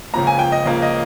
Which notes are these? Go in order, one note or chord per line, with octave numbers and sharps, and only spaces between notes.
C#2 C#3 F3 A#3 A#5
G#5
G5
D#5
C#2 C#3 F3 A#3
D#5